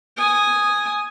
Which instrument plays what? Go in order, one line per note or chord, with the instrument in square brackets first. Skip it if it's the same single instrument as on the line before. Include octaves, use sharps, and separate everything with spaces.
[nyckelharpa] G#5 D#6